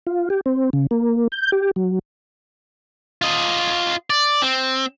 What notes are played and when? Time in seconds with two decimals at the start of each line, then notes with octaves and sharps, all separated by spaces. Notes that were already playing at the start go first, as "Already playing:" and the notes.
0.07 F4
0.30 G4
0.46 C4
0.73 C#3
0.91 A#3
1.32 G6
1.52 G4
1.76 F#3
3.22 F4 D#5
4.10 D5
4.42 C4